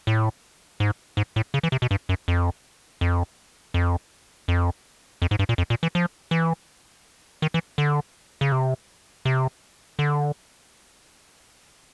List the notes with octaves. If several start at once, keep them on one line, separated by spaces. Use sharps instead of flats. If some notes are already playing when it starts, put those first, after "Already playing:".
A2
G#2
G#2
A2
C#3
E3
C3
B2
G2
F#2
F2
F2
F2
F2
F2
G#2
G2
A#2
F2
A#2
E3
F3
E3
D#3
E3
D3
C#3
C3
C3
D3